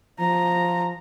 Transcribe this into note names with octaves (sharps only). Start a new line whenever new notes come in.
F3 A#5